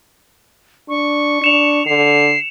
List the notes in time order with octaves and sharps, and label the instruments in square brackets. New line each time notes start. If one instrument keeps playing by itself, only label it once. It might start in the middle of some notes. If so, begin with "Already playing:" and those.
[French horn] D4 [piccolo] C#6
[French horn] D4 [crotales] C#7 E7 F7
[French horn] D3 [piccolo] C7